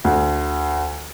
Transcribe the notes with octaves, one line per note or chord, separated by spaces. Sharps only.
D2